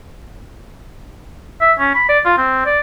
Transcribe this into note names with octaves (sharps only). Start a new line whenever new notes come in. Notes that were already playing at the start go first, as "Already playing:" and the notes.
E5
C#4
B5
D5
F4
C4
D5